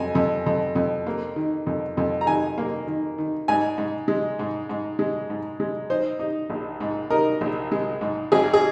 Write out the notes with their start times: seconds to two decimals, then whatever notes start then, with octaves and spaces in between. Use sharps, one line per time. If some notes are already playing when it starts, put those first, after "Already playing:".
Already playing: F2 G#5
0.15 F2
0.46 F2
0.75 F2
1.07 A#3
1.36 D#3
1.67 F2
1.97 F2
2.21 A#5
2.27 D#3 G#5
2.58 A#3
2.87 D#3
3.18 D#3
3.48 G#2 G#5
3.78 G#2
4.08 G#3
4.39 G#2
4.69 G#2
4.99 G#3
5.30 G#2
5.60 G#3
5.90 D#4 C5
6.19 D#4
6.50 A#1
6.80 G#2
7.10 D#4 A#4
7.41 A#1
7.72 G#3
8.01 G#2
8.32 G#1 G#4
8.54 G#4